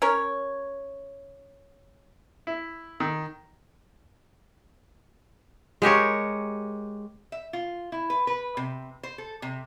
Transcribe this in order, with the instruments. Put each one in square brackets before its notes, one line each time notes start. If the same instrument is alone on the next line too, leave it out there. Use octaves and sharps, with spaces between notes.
[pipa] C#4 A#4 C#5
[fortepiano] E4
D#3
[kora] G#3 G4 A#4 C#5
[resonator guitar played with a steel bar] E5
F4
E4
B4
B4
C3
C5
A4
C3